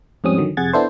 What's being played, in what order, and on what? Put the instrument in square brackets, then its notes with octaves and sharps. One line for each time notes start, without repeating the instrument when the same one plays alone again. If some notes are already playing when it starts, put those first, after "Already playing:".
[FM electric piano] F2 G#2 G3 C4 C#4 D#6
D3 D#3 F#3
F2 C3 G#4 F#5 G#6 A6
B3 D4 E4 A4 C5